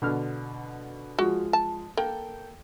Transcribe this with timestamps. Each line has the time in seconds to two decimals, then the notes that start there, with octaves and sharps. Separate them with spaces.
0.02 B2 D3 F6
1.19 F3 G#3 F#4
1.53 A5
1.97 A#3 A4 G5